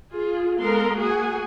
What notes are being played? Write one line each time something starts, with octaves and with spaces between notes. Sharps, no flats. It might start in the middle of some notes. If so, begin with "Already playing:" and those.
F4 G#4
G#3 B3 A4 A#4 F5 C6
A#3 F#4 G#4 F#5 G#5